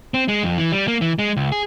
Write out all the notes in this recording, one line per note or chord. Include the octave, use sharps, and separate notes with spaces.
C4
G#3
F2
E3
G3
A#3
E3
G#3
C#2
G#4